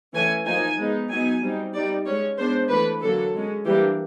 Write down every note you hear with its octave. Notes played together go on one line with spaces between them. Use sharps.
E3 A3 C#4 G#5
F3 A#3 D#4 G#5
G#3 B3 D#4
F#3 B3 D#4 G#5
G3 C4 D#4
G3 C4 D#4 D5
G#3 C#4 C#5
G#3 B3 D4 C5
E3 A3 D4 B4
D3 F#3 A#3 A4
G#3 C#4
E3 G3 A#3 D4 G4